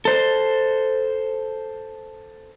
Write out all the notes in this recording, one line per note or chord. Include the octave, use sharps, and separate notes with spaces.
A4 C5